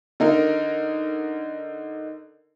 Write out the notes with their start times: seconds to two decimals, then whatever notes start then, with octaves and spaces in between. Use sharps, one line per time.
0.20 D3 D#4 A#4